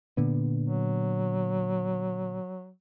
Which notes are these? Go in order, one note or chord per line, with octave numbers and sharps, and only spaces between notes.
A#2 D3 B3
F#3